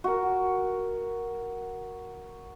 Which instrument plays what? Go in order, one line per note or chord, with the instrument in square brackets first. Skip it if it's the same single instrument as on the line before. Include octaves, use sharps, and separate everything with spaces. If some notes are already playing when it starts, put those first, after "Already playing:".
[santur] F#4 A#4